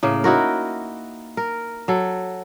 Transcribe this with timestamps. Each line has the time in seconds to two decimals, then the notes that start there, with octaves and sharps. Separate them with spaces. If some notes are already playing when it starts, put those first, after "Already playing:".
0.03 A2 C#3 A#3
0.24 D#4 E4 F#4 A#4
1.37 A#4
1.88 F#3 A4